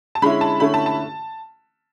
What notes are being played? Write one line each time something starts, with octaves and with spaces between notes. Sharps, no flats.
A5
D3 G#3 C#4 E4 B5
A5
D3 A3 C#4 E4 B5
A5
A5